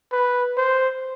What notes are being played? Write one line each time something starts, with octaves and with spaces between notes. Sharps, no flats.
B4
C5